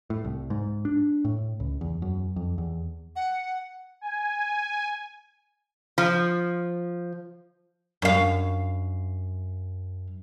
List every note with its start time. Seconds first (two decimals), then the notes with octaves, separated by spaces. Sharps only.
0.10 A2
0.25 C2
0.50 G#2
0.85 D4
1.25 A2
1.60 C#2
1.81 E2
2.02 F#2
2.36 F2
2.58 E2
3.16 F#5
4.01 G#5
5.98 F3
8.02 F#2 F5